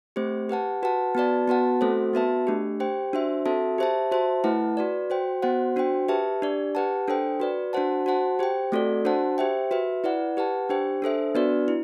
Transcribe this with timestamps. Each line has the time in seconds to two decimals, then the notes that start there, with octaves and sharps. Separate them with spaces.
0.16 A3 C4 G4 C5
0.49 G4 B4 F#5 A5
0.83 F#4 B4 F#5 A5
1.15 B3 F#4 B4 D5 A5
1.48 B3 F#4 B4 F#5 A5
1.81 A3 C4 F#4 A4 C5
2.14 B3 F#4 B4 E5 A5
2.47 A3 D4 G4
2.80 G4 C5 G5
3.13 D4 F#4 C5 E5
3.45 C4 F#4 A4 E5 A5
3.78 G4 C5 E5 A5
4.11 F#4 C5 E5 A5
4.44 A3 E4 B4 F#5 A5
4.77 F#4 B4 D5
5.10 F#4 C5 G5
5.42 B3 F#4 C5 F#5
5.76 D4 F#4 C5 G5
6.08 G4 B4 E5 A5
6.42 D4 G4 D5
6.75 G4 B4 F#5 A5
7.08 D4 A4 C5 G5
7.40 F#4 B4 D5
7.73 D4 F#4 C5 F#5 A5
8.06 F#4 C5 F#5 A5
8.39 G4 C5 G5
8.72 A3 C4 F#4 A4 D5
9.05 D4 F#4 C5 F#5 A5
9.38 G4 C5 E5 G5
9.71 F#4 B4 E5
10.04 E4 B4 D5 F#5
10.37 G4 B4 F#5 A5
10.69 D4 G4 C5 G5
11.02 D4 A4 C5 E5
11.35 B3 D4 F#4 B4 D5
11.68 E4